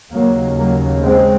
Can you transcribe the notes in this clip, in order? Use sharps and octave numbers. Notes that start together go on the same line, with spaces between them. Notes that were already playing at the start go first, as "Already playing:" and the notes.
D#2 C#3 F#3 A#3
F#3 A#3
G#3 C4